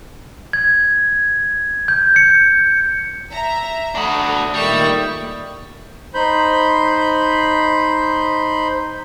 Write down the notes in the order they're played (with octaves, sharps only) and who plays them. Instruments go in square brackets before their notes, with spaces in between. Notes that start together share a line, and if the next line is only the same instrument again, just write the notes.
[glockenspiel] G#6
G6
C#7
[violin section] E5 A#5
[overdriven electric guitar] D4 F#4 [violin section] A4 [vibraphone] B5 D#6
[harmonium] A#2 D#3 A3 [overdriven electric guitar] G3 [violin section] G5 C#6 E6
[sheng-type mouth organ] D#4 C5 B5 G6